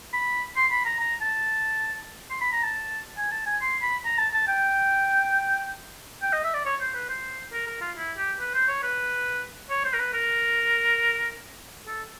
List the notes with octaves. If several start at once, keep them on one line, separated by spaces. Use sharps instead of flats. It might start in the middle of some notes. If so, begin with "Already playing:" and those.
B5
C6
B5
A#5
A#5
A5
C6
B5
A#5
A5
G#5
A5
G#5
C6
B5
A#5
A5
A5
G5
G5
D#5
E5
D5
C#5
C5
B4
C5
A#4
A#4
F4
E4
G4
B4
C5
C#5
B4
C#5
C5
A#4
B4
A#4
A4